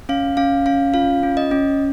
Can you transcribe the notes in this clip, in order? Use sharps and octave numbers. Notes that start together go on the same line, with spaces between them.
C#4 F5
C#4 F5
C#4 F5
F4 F5
C#4
D#5
C#4